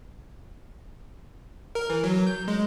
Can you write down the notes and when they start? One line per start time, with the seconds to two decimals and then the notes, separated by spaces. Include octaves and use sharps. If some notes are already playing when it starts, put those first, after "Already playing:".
1.75 A#4
1.90 E3
2.04 F#3
2.27 G6
2.48 G#3